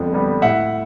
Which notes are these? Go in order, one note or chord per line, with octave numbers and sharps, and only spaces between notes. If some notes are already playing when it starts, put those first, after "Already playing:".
Already playing: F2 D3 G3 B3
D3 G3 B3
A2 E5 F#5